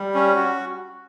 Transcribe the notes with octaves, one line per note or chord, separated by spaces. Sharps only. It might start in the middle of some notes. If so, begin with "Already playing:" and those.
Already playing: G3
C#4
F#4